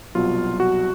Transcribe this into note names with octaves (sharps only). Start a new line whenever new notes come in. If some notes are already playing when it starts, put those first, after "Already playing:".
C2 B2 F#3 F4
F#4